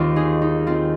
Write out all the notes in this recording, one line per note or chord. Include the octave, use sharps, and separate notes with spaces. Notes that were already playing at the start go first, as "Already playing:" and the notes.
Already playing: D#2 D#3 C4 F4
D#4 G#4
D#4
C4 F4